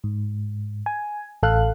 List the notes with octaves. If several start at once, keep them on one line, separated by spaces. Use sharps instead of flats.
G#2
G#5
A1 A4 F5 F#6